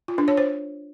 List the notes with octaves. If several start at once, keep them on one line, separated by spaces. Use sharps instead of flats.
F4
D4
C#5
C5